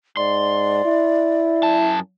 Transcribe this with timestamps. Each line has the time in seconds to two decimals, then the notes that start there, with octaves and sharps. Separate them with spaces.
0.17 G#2 D5 C6
0.85 E4
1.63 F#2 A5